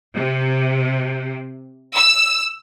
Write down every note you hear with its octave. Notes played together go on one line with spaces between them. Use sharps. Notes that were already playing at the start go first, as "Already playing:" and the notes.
C3
E6